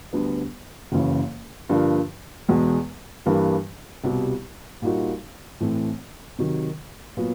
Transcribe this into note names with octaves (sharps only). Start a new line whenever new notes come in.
D2 D3 G3 B3
F#1 F#2 C#3 E3
G2 D3 F3 A#3 D4
E2 B2 G#3
G2 E3 G3 A#3
C2 B2 G3
A#2 G3 A#3 D#4 F#4
A2 E3 A3 C4
C3 D#3 F#3
A#2 F#3 B3